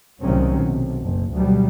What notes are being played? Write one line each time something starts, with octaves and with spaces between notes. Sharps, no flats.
C2 A2 D#3 F#3 C4 C#4
B1 C3
F#1
D2 B2 F#3 G3